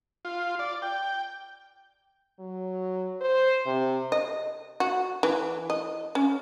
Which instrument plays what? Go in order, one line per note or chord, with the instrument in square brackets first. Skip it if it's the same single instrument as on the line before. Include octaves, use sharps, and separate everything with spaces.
[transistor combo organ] F4
D5
G5
[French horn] F#3
C5
C3
[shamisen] D#5
F#4
E3
D#5
C#4